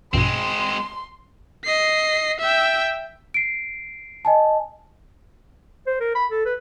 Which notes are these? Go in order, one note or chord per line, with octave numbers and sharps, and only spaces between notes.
A#1 G2 B2 G#3 C4 C6
D#5 C7
E5 G5
C7 D7
D#5 G#5 A5
C5
A#4
B5
A4
B4